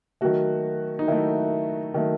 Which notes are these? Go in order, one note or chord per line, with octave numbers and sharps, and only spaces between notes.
D#3 F#3 A3 F#4
D#4
D#3 F#3 A3 E4
D#3 F#3 A3